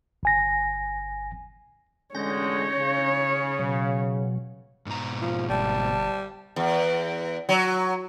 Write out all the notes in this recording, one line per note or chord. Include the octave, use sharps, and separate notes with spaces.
G1 G#5 A#6
A1 D3 G#3 C#4 C#5 G6 A#6
C#3
B2 F#3
G#2 B2 A#5
F3
G1 G3 A5
E2
F#3